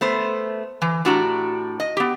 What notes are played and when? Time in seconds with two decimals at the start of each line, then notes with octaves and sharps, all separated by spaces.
0.01 A3 B3 C5
0.82 E3
1.05 A2 D4 F#4 G4 A#5
1.80 D#5
1.97 B3 G4